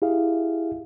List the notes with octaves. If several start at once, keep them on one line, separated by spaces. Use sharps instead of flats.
E4 G4 G#4 E5 F5